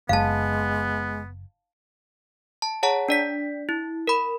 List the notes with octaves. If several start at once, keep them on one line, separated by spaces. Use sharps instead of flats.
F#1 G#3 B3 F5 A5
A5
G#4 C#5 F#5 A5 A#5
D4 D5 B6
E4
A#4 B5